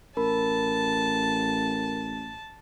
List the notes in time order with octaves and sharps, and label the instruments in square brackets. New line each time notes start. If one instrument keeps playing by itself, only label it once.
[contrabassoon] A1 [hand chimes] A#4 B5 [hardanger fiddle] A5